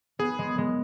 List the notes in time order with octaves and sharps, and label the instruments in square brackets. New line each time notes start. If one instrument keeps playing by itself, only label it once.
[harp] B3 [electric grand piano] G#4
[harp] G#3
G#3